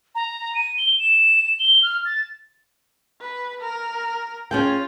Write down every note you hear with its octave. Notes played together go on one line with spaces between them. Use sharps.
A#5
D#7
G7
E7
G7
F6
A6
B4
A#4
C#4 F4 G#4 G5